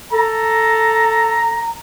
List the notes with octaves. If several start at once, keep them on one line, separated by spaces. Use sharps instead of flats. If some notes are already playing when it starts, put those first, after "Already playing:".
A4 A#5